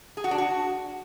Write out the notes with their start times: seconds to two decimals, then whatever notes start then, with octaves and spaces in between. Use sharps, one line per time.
0.17 G#4
0.24 F#4
0.31 D4
0.38 F#4